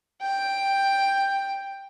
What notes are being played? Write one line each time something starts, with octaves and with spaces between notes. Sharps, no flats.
G5